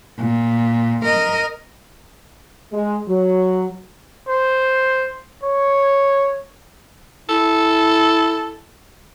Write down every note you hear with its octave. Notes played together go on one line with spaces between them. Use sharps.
A#2
A#4 D#5
G#3
F#3
C5
C#5
E4 A4